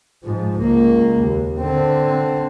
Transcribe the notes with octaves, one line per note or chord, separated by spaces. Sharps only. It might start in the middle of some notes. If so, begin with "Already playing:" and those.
G#2 F3
C#2 A#3
D#2
D3 C4